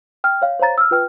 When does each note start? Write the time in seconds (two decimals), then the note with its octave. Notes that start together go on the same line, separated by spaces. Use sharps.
0.24 G5 F6
0.42 C#5 F5
0.59 C5 C#5 F5 A#5 A6
0.78 E6 F6
0.91 F4 B4 G5 F6